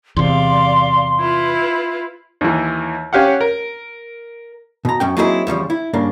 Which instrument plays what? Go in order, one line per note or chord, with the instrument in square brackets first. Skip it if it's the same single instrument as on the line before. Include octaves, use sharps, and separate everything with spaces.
[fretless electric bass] E2 C3 [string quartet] D5 F5 [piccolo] C6
[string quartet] E4 F4 B4
[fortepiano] D#2 E3
C#4 G4 F5 F#5
A#4
[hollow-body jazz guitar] B2 A#5
F#2 C#4 G5
F#3 A#3 C4 D#4 E4 G#4
E2 C#3 F3 G3
E4
G2 C#3 A#3 D4